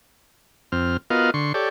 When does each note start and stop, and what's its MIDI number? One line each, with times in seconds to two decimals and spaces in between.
0.72 0.97 41
0.72 0.97 60
0.72 0.97 89
1.10 1.31 59
1.10 1.31 65
1.10 1.31 66
1.10 1.31 70
1.10 1.31 75
1.10 1.31 77
1.34 1.53 50
1.34 1.53 84
1.34 1.53 85
1.54 1.69 67
1.54 1.69 69
1.54 1.69 73
1.54 1.69 74